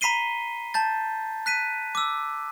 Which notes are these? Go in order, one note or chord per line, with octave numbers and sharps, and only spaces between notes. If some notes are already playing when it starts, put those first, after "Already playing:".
A#5 B5 B6 C7 D#7 G7
A5 G6 A6
F#6 B6 D#7
D6 E6